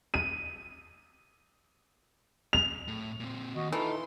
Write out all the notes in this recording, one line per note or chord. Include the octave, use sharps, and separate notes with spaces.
D#7
F7
A2
A#2 C4
D#2 F#4 D#5
E3 D#4 F4 A4
C6